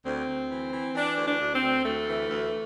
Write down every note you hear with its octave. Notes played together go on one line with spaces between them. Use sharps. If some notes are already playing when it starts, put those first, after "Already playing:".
D2 C4
D2
E3
E3
E3 D4
D2
D4
D2
C4
D2
D2 A3
E3
D2